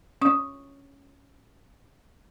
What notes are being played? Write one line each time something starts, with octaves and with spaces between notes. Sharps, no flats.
C#4 D#6